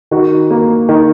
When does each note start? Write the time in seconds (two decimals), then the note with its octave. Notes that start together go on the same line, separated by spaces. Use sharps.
0.11 D#3 F#4
0.51 A#3
0.89 D#3